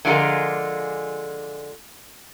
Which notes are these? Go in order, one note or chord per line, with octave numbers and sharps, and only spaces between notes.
D3 F3 G#3 F4 G#4 A#4